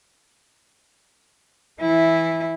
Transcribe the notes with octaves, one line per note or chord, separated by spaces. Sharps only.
E3 E4